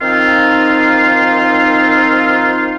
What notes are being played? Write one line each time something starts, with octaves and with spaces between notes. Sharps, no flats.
D#3 F3 C4 D#4 F4